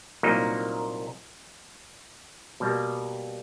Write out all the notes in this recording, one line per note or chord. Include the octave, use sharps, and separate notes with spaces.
C2 A#2 F#3 A#3 D#4
B2 G3 A#3